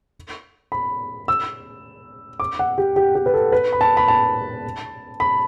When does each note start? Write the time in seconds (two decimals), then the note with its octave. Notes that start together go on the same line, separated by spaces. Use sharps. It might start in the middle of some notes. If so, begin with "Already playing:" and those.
0.72 B5
1.28 E6
2.40 D6
2.59 F#5
2.78 G4
2.96 G4
3.15 G4
3.26 B4
3.34 A4
3.52 B4
3.73 B5
3.81 A5
3.97 B5
4.08 A5
5.20 B5